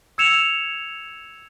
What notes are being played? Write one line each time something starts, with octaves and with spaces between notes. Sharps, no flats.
E6 G#6 C#7 E7 F7